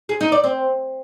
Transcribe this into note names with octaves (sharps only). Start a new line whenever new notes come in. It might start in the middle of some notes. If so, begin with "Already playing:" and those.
G#4
D#4
D5
C4